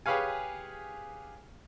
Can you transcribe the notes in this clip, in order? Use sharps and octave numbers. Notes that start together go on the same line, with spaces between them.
G4 G#4 B4 C#5 F5 G#5